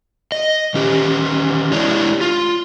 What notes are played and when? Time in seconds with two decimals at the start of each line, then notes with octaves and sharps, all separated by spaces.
0.32 D#5
0.74 D#3 C#4 G4
1.72 G#3 D4 E4 G4 C#5 D5
2.21 F4